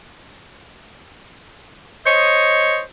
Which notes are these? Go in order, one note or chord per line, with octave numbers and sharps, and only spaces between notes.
C5 C#5 D#5